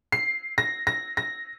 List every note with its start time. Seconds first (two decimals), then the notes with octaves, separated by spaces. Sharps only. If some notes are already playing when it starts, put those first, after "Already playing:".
0.12 C7
0.58 A#6
0.87 A#6
1.17 A#6